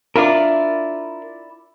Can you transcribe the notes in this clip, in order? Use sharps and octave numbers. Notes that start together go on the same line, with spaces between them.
D4 E4 F4 A#4 D5